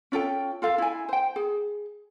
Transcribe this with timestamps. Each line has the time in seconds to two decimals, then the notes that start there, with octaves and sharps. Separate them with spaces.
0.12 C#4 F4 A4 G5
0.62 F4 A4 F5
0.78 E4 G#5
1.09 C5 G5
1.36 G#4